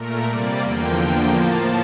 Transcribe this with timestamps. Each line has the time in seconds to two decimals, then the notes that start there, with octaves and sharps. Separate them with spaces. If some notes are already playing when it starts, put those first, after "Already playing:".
Already playing: A#2 A3 A#4
0.24 C3 G3 A#3 D5
0.60 E2 D3 F3 A#3 G5
0.95 E2 D3 F3 A#3 G5
1.30 A2 F3 A#3 A5